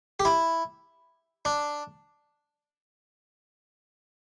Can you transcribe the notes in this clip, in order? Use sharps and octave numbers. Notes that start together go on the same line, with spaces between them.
G4
E4
D4